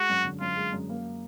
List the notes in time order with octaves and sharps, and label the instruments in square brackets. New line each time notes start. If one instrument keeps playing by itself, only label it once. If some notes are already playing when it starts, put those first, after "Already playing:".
Already playing: [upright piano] G#3 [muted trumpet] F#4
[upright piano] F#2
D3
[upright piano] F#2 [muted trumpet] F4
[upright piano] G#3
F#2
A#3